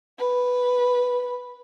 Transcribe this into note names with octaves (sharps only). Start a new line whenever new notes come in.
B4